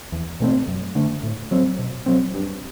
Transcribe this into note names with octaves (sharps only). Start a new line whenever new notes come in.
E2
B2 A3 C4
F#2
D3 A3
A2
F#3 C4
B2
F#3 C4
G2